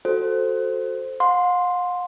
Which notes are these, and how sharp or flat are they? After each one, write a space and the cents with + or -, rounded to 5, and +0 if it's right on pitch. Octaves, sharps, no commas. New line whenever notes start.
F#4 -10 A4 +0 C5 +0
F5 +45 C6 +0